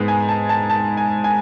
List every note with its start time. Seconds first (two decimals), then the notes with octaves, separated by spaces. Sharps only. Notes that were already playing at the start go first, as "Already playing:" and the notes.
Already playing: G#2 G#3 B3
0.08 G#5
0.29 A5
0.49 A5
0.70 A5
0.97 G#5
1.24 G#5